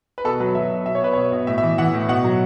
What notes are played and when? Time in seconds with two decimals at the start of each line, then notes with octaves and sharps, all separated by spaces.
0.18 B4
0.24 B2 A4
0.40 F#3 B4
0.55 F#3 E5
0.71 B2
0.86 B2 E5
0.95 C#5
1.02 B2 B4
1.13 B2 C#5
1.32 B2
1.47 A2 E5
1.58 E5
1.63 E3
1.78 E3 F#5
1.93 A2
2.08 B2 F#5
2.24 F#3